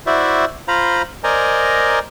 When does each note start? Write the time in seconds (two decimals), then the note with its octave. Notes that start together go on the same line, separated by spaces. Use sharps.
0.07 E4 F#4 C5 D5 E5
0.68 F4 C5 F5 A#5 B5
1.24 A#4 C5 D5 D#5 G#5 A#5